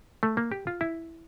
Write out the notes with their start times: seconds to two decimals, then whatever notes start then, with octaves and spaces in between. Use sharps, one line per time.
0.23 A3
0.37 A#3
0.52 G4
0.67 F4
0.81 E4